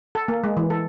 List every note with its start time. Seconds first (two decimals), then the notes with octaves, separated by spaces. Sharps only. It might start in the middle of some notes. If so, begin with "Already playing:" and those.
0.15 A4
0.28 A#3
0.44 G#3
0.57 E3
0.70 A4